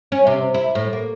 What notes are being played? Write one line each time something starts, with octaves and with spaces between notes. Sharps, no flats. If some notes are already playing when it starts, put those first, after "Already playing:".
C#4
C3
E4
A2
A#3